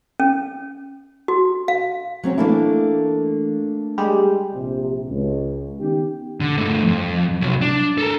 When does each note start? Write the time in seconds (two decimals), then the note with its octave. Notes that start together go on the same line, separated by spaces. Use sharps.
0.20 C#4
1.28 F#4
1.68 F5
2.23 F#3 C4 C#4
2.38 E3 A3 A#3 D4
3.98 G3 G#3 G4
4.54 A#1 C3
5.09 C#2
5.80 D#3 B3 C#4 D#4 G4
6.41 D3
6.57 G2 A3
6.84 F2
7.41 C2 F#3
7.61 D4
7.98 A4 A#4